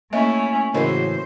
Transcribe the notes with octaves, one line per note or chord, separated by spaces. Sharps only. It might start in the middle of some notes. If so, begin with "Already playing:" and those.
A3 A#3 C#4 E4 D#5 E5
A2 C#3 E3 F#4 A#4 C5 D#5